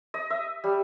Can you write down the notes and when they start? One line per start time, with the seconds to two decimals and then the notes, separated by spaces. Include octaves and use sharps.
0.14 D#5
0.30 E5
0.64 G3